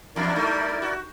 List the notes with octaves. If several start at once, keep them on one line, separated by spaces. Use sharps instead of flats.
E2 G2 D4 E4 A#4 D5
G3 A3 D#4
F#4